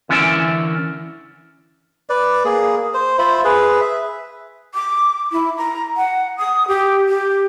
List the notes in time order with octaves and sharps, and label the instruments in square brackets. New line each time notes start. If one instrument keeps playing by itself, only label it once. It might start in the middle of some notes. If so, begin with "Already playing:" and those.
[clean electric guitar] D3 E3 C#4 A#4 D5 E5
[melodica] B4 D5
A#3 G#4
C5
F4 C5 E5 B5
G#4 B4
E5
[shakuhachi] D6
E4
A#5
F#5
D#6
G4
G4